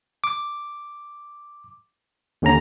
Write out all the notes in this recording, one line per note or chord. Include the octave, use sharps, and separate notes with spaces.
D6
D#2 D3 C#4 A#5